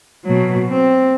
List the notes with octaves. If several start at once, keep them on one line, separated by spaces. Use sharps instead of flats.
B2 F#3
C4